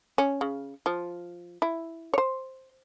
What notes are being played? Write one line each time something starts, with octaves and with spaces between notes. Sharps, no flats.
C#4
C#3
F3
E4
C5 C#5